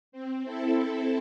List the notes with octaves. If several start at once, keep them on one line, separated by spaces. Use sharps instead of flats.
C4
E4 A4